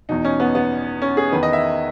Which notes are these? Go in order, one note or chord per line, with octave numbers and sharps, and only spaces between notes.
E2 B2 D#4
C#4
B3
B3
C#4
G#4
E2 D#3 B4
D#5
E5